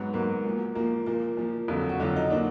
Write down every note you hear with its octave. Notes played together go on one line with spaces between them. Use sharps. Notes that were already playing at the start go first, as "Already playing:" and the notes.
Already playing: G#2 F#3 B3
G#2 F#3 A#3
A#2 F3
A#2 F3 A#3
A#2 F3 A#3
A#2 F3
F2 D3 F#3
F#4
F2 D3 F#3 F4
D#4
A#2 F#3 D4